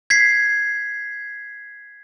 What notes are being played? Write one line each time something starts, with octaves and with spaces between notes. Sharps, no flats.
G#6 B6 C7